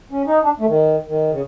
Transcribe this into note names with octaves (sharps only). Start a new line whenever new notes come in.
C#4
D#4
D4
A3
D#3
D#3
C#3